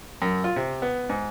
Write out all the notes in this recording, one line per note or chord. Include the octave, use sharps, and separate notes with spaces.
F#2
F4
C3
B3
G#2